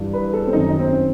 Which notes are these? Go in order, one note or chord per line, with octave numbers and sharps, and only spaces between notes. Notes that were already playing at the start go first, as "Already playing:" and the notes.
Already playing: G2 E3
B4
A4
C4
F#2 D#3 D#4
D#4
C4